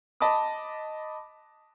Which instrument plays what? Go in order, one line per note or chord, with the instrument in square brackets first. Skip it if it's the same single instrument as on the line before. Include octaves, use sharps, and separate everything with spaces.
[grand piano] D#5 A5 B5 D6 D#6